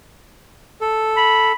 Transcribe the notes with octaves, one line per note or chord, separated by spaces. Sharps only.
A4
B5